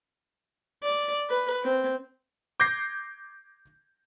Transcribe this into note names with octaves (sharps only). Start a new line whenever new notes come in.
D5
B4
C4
D6 G6 G#6 A#6 C7